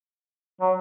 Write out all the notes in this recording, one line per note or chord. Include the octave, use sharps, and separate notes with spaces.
F#3